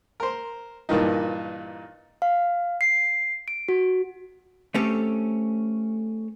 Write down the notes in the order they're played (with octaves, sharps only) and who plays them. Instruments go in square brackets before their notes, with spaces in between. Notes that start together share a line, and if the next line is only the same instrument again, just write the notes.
[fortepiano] A#4 C5
G2 A#2 D#3 E3 D#4
[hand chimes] F5
C7
D7
F#4
[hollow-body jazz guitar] A3 C4 C#4 G4 A4